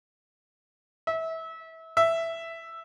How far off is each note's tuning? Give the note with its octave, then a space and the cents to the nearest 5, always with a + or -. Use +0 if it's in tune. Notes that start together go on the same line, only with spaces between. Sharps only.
E5 -25
E5 +5